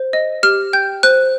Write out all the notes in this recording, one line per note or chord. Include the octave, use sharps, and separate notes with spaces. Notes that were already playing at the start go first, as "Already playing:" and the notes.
Already playing: C5
D#5
G4 F6
G5 G6
C5 F#6